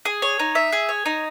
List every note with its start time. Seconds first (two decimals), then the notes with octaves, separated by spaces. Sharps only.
0.05 G#4
0.22 C#5
0.39 D#4
0.55 E5
0.72 G#4
0.89 C#5
1.06 D#4